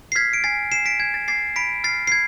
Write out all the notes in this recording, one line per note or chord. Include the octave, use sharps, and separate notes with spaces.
C7
F6 G#6 B6
D7
G#5 A6 C7
G#5 C7 E7
B6 D7
G#5 G#6
A6
D6 A6 C7
B5 B6 D7
F6 A6 C7
C7
G#6